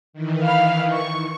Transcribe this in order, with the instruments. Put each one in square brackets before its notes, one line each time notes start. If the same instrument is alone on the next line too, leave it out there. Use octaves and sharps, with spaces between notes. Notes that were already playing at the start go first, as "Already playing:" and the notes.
[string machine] D#3 E3
[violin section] F5 B5 F6
C#6